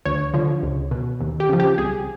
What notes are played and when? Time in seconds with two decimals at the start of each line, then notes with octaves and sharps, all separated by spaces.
0.05 D2 C#5
0.34 D3 F3
0.63 C#2
0.91 B2
1.21 D#2
1.40 G4
1.49 C#3 F3
1.60 G4
1.78 C2 G#4